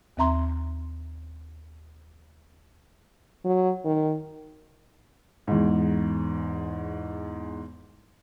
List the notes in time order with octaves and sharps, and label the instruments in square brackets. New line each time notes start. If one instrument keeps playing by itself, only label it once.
[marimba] D#2 C4 E5 A#5 C6
[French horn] F#3
D#3
[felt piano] E2 G#2